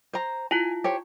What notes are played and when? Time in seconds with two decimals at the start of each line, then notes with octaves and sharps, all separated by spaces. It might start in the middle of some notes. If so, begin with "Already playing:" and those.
0.13 C5 A#5
0.51 E4 F4 G#5
0.84 G4 C5 C#5